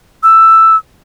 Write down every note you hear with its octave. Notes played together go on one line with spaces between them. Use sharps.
E6